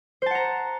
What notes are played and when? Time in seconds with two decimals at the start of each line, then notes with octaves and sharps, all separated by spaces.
0.22 C5
0.26 A5
0.31 F#5
0.35 A#5